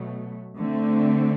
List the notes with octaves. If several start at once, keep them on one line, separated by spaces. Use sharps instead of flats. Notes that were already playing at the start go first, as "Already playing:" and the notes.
Already playing: B2 F#3 A3
D3 A3 C4